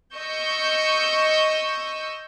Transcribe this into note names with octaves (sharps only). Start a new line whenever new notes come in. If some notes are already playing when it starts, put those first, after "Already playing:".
D#5 C#6 E6 G6